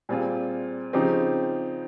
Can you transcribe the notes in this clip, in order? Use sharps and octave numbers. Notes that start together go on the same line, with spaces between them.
A#2 G3 C4 F4 G#4
C#3 F3 C4 D#4 G4